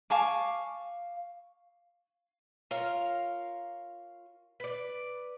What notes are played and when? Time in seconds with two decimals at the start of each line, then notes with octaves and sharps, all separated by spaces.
0.10 F5 G#5 A5 C#6 D6
2.71 F4 A#4 C#5 F5
4.60 B4 D5